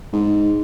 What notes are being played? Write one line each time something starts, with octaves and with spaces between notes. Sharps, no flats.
G#2